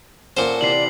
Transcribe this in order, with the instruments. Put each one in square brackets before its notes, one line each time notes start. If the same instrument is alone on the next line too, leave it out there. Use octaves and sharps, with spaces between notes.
[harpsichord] A#2 C5 [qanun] C#4 A4 F#5
[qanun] C3 E3 B4 [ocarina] D5 [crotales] C7 F#7